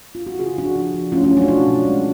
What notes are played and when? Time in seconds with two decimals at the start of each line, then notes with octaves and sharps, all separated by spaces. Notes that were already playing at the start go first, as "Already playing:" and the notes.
0.15 F4
0.27 F#4
0.39 C#3 F4 G#4
0.57 F3 D4 F#4
0.76 F3
0.94 F3
1.12 A3 C#4 F4
1.24 C#4 F4
1.30 F#3
1.37 D4 F#4
1.42 F4
1.48 B2 D4 F#4
1.67 B2
1.85 G#3